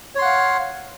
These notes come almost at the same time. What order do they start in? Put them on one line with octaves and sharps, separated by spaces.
C#5 C6 F#5 F5